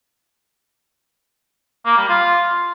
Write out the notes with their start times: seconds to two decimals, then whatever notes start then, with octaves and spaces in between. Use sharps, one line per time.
1.85 A#3
1.97 G3
2.09 F4